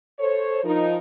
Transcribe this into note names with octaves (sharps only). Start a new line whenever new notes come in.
A4 C5 C#5
F3 D#4 A#4